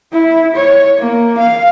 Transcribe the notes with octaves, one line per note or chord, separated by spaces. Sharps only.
E4
C#5
A#3
F5